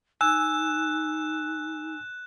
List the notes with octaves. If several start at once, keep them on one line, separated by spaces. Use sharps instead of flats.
D#4 G#5 E6 F#6 E7